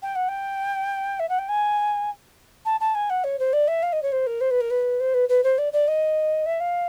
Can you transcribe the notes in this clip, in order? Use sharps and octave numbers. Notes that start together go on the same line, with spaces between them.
G5
F#5
G5
E5
F#5
G5
G#5
A5
A5
G#5
F#5
C#5
C5
D5
E5
F5
D#5
C#5
C5
A#4
C5
B4
A#4
B4
C5
B4
B4
C5
D5
D5
D#5
E5
F5